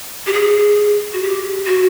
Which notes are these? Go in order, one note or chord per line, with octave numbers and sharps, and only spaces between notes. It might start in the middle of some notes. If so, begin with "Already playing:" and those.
G4
G#4
F#4
G4
F#4